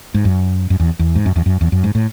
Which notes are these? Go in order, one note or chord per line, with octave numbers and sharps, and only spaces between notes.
G#2
F#2
F#2
E2
E2
G#2
F#2
E2
F#2
E2
F#2
G#2
A2